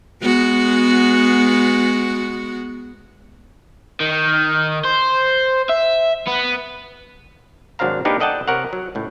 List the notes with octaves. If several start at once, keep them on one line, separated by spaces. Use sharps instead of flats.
G#3 B3 F#4
D#3
C5
E5
B3
G#1 F#3 D4 C5 F5 A#5
A#3 D4 D#4 G4 A#4 B4
A4 D5 D#5 F#5 G5 A5
C3 A#4 C#5 F#5
F#3
C#2 A2